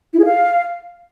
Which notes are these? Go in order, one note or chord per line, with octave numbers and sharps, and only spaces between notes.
E4
G#4
F5